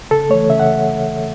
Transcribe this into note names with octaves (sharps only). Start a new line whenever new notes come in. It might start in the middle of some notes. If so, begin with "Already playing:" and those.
C#3 A4
E3 A3 C#5
C#3 E5
F#5